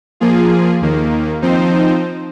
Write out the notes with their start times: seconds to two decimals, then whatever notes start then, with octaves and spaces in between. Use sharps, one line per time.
0.20 F3 A#3 F4 G#4
0.81 D#2 D#3 A#3
1.42 F3 C4 D#4 C5